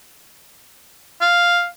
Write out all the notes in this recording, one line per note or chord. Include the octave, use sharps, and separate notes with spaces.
F5